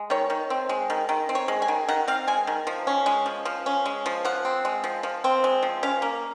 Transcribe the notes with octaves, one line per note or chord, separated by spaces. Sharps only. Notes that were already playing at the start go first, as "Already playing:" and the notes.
Already playing: G#3
D#3 C#5
D#3
C4
G#3
D#3
D#3
C4
C#5
G#3
G#5
D#3
D#3 F#5
C4 F5
G#3 G#5
D#3
F3
C#4
G#3
F3
F3
C#4
G#3
F3
F3 F#5
C4
G#3
F3
F3
C4
G#3
F3
C#4 F5
A#3